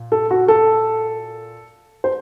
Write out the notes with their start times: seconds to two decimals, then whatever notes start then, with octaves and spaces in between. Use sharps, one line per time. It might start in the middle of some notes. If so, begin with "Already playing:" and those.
Already playing: A#2
0.12 A4
0.31 F#4
0.48 A4
2.04 C5